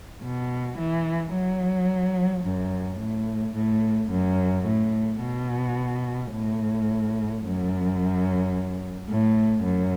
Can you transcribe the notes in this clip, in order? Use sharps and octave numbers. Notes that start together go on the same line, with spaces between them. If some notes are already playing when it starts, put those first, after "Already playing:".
B2
E3
F#3
F#2
A2
A2
F#2
A2
B2
A2
F#2
A2
F#2